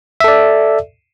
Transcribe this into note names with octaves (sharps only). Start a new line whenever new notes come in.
A4 D5 E5